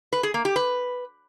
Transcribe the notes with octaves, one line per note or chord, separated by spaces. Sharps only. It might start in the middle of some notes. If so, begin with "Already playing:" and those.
B4
G#4
A#3
G4
B4